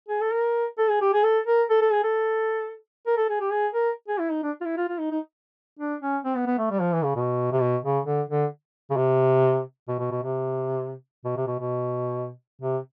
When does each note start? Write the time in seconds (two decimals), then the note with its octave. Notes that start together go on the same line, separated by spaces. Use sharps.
0.08 G#4
0.21 A4
0.33 A#4
0.78 A4
0.90 G#4
1.01 G4
1.13 G#4
1.24 A4
1.47 A#4
1.70 A4
1.82 A4
1.92 G#4
2.04 A4
3.07 A#4
3.17 A4
3.29 G#4
3.40 G4
3.51 G#4
3.74 A#4
4.08 G#4
4.20 E4
4.31 D#4
4.43 D4
4.61 F4
4.65 E4
4.77 F4
4.88 F4
5.00 D#4
5.11 D#4
5.79 D4
6.02 C#4
6.25 C4
6.36 B3
6.47 B3
6.58 A3
6.71 G3
6.81 F3
6.92 E3
7.04 C#3
7.16 B2
7.52 C3
7.61 B2
7.84 C#3
8.06 D3
8.30 D3
8.91 C#3
8.97 C3
9.88 B2
9.99 B2
10.11 B2
10.23 C3
11.25 B2
11.37 C3
11.47 B2
11.59 B2
12.62 C3